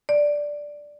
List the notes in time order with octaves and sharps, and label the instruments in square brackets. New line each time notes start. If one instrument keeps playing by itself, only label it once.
[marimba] D5